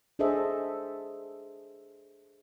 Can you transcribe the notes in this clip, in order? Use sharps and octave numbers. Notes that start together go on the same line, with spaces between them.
D4 G#4 A4 C5 D#5 E5